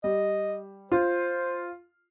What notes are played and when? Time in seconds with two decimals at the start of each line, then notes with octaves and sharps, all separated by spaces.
0.04 G3 D#5
0.92 F4 C5